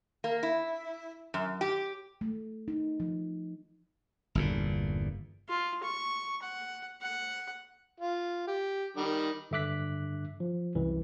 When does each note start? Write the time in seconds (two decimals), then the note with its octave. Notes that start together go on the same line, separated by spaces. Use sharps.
0.24 A#3
0.43 E4
1.34 F#2
1.61 G4
2.21 A3
2.68 D#4
3.00 F3
4.35 G1 E2 A#2
5.48 F4
5.83 C#6
6.43 F#5
7.02 F#5
8.00 F4
8.48 G4
8.97 D#3 G3
9.51 G2 D3 E5 D6 F#6 B6
10.40 F3
10.75 C2 F#2 E3